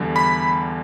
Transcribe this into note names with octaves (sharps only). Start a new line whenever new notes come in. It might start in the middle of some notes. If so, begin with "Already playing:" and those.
Already playing: E2 D3 G3
B5